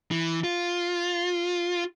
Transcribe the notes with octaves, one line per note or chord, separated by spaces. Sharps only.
E3
F4